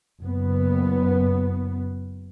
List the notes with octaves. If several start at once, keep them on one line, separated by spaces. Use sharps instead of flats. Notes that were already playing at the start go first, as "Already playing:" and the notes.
F#1 B3